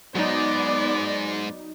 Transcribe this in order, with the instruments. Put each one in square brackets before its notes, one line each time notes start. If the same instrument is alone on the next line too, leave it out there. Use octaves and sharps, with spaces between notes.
[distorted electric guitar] G#2 G#3 [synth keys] F#3 D#4 [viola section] B3 D5